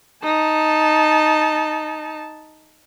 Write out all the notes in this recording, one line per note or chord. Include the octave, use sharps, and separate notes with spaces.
D#4 A5